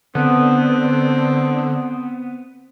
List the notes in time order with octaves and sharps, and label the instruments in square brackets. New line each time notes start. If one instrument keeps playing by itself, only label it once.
[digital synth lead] D3 [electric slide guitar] B3 [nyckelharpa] C4